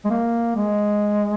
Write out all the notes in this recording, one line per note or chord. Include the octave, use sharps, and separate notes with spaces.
G#3
A#3
G#3